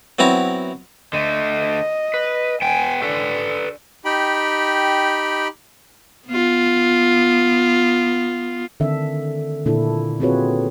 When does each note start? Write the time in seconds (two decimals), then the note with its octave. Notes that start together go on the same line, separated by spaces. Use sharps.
0.19 F#3 B3 C4 E4 A#5
1.13 D3 A3 D#5
2.14 B4
2.62 B3 G5 G#5
3.02 D3 A4 B4
4.05 D#4 G4 G5 B5
6.27 B3 F4
8.80 D3 D#3 C4 D4 E5
9.66 A#2 D3 A#3 D4 E4 A4
10.20 C4 F4 F#4 G#4 B4 C#5